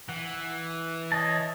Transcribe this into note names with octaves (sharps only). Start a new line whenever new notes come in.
E3 F#5
C#5 D#5 A5